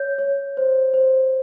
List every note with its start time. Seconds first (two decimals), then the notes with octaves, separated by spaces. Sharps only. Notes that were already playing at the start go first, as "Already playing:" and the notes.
Already playing: C#5 G6
0.19 C#5
0.57 C5
0.94 C5